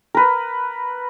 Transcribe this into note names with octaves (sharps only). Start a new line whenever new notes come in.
A#4 B4